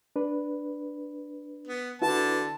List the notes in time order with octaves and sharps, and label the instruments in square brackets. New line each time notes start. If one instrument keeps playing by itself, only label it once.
[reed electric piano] D4 B4
[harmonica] B3
[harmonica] D3 A5 [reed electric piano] E4 F#4 B4